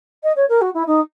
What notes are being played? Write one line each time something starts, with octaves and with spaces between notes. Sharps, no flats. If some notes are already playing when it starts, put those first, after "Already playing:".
D#5
C#5
A#4
F#4
E4
D#4